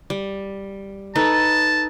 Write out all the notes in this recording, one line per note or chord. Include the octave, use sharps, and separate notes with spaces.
G3
D#4 A4 B4 A5